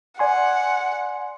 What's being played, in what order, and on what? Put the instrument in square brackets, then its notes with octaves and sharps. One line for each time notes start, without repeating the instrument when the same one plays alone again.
[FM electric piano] D5 G#5 C6 [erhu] F#5